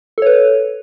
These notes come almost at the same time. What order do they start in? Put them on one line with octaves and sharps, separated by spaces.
A4 C#5 B4